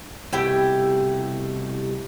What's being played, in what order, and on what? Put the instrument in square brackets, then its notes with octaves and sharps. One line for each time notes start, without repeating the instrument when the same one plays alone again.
[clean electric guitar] C2 B2 A3 [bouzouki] E4 G4 G5